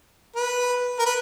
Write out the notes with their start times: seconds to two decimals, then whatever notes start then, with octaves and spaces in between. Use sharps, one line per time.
0.36 B4
0.99 A#4
1.06 B4